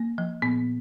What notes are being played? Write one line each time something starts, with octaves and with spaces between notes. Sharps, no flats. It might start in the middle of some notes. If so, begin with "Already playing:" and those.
Already playing: A#3
F3
A#2 B3